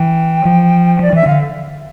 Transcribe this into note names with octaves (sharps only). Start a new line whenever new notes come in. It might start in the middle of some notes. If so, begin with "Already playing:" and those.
Already playing: E3 G5
F3
F3 D5
E3 E5
D3 F5